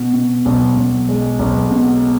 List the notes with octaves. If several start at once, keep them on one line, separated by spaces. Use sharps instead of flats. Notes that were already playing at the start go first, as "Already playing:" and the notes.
Already playing: B2
B2
B1
B1
G#3
B1
B2